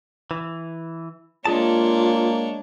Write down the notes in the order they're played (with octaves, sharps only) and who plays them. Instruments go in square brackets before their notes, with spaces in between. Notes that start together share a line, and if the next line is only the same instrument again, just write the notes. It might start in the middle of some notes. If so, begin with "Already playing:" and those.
[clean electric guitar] E3
[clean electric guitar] G#3 G#4 A5 [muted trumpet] A#3 [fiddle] D4 C#5 [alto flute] F4